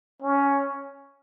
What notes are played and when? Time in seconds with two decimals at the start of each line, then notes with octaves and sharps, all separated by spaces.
0.22 C#4